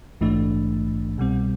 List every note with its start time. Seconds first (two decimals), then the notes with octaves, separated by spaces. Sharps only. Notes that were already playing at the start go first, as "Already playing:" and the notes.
0.21 A#1 G#2 E3 A3 D4
1.18 C2 B2 G3 C4